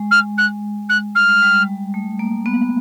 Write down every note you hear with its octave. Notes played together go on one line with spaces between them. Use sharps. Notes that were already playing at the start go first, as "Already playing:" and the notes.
Already playing: G#3
F6
F#6
F#6
G3 F6
G#3
G3
A3
A#3
B3